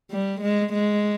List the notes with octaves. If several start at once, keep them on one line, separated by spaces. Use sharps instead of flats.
G3
G#3
G#3